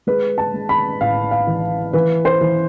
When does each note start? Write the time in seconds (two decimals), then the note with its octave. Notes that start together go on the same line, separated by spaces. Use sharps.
0.07 G#3 B4
0.38 A5
0.54 G#3
0.69 B5
1.01 A1 F5
1.31 F5
1.47 E3
1.93 E3 B4
2.25 C5
2.41 E3